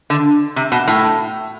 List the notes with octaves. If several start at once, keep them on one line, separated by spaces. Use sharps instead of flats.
D3
C3
B2
A2